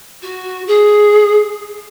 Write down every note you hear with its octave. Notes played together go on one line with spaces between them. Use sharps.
F#4
G#4